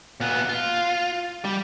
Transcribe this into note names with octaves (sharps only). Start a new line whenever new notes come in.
A#2 B3
F4
G3